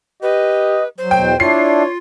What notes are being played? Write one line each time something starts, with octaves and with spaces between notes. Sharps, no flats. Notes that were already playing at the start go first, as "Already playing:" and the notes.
G4 B4 D#5
F#3 C5
E2 B2 G5
D4 E4 F4 C#5 C7